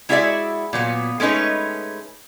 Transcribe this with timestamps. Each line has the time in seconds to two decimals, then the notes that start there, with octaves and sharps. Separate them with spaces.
0.09 G#3 E4 F#4 G#4 D5 E5
0.73 A#2 F#3 B3
1.20 G#3 A3 C#4 D#4 B4